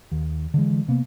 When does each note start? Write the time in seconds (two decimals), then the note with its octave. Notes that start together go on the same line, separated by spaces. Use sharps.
0.12 D#2
0.54 D3 E3 G#3
0.88 C3 A#3 B3